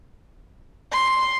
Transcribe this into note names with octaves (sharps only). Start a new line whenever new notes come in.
C6